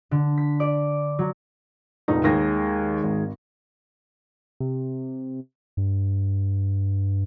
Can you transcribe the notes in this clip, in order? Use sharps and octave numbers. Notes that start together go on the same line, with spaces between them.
D3
B6
D5
F#3
F1 A#1 D#4
D#2 D#3 G#3 A#6
G#1
C3
G2